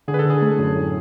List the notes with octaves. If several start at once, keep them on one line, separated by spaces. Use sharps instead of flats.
D3 G#4
B4
A4
D3
G#4
A3
F#2
A2